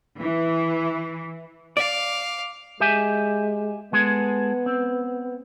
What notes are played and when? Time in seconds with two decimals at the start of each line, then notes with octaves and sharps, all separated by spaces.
0.21 E3
1.77 D5 F5 D6
2.80 G#3 G4 E5 G#5
3.93 G#3 B3 G#4 A4
4.66 C4